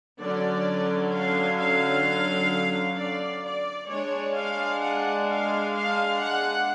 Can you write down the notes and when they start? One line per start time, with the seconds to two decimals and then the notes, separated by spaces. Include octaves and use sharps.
0.19 D3 F#3 C#4 D5
1.12 F5
1.58 F5
2.97 D5
3.44 D5
3.90 G#3 D4 C#5
4.37 F5
4.83 F#5
5.29 F5
5.76 F5
6.22 F#5